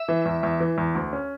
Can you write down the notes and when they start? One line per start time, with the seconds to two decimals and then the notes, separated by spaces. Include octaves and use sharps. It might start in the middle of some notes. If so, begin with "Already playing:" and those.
Already playing: E5
0.08 E3
0.26 E2
0.43 E2
0.60 E3
0.78 E2
0.95 D2
1.13 C#4